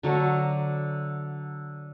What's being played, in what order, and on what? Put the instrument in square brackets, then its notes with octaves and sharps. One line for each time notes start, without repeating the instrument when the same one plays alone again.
[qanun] D3 F#3 A3 A#5